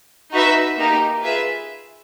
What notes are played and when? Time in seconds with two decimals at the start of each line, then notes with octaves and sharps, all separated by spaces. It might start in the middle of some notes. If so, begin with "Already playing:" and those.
0.32 D#4 F#4 B4 E5
0.77 A#3 D#4 G4
1.23 F4 G#4 B4 E5